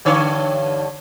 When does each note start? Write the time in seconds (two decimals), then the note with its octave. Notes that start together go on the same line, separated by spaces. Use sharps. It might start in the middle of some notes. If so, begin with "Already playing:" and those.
0.05 G2 D3 C#5